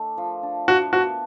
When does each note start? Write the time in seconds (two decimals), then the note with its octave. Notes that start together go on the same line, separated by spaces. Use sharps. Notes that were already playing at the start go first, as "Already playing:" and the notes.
Already playing: A3 D4
0.18 F3
0.43 D4
0.68 D4 F#4
0.93 B3 F#4